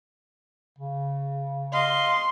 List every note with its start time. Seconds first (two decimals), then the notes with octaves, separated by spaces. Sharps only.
0.79 C#3
1.73 D#5 F5 C6